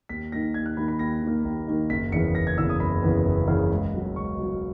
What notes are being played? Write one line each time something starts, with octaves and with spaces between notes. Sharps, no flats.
D#2 B6
D#3 A#3 A#6
D#2 G#6
F#6
D#3 A#3 B5
B5
D#2 A#6
D#3
A#3
D#2
D#3 A#3
F#1 B6
E2 C#3 E3 B3 C#7
F#1 A#6
G#6
E2 C#3 E3 B3 E6
D#6
F#1 B5
E2 C#3 E3 B3
F#1
E2 C#3 E3 B3
C#2
B2 F#3
C#2 C#6
B2 F#3